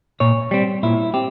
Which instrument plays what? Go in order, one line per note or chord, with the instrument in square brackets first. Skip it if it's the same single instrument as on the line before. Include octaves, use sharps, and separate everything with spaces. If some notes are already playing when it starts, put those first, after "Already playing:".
[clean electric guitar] A#2 C#5
G3 C4
A#2 E4
C4 G4